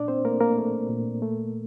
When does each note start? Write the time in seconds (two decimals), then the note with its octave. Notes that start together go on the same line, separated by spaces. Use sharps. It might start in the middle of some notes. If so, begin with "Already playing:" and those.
Already playing: A#2 D4 D5
0.08 C4 C5
0.25 A3 A#3 A#4
0.41 A#3 A#4
0.57 A3
0.89 A#2
1.22 A3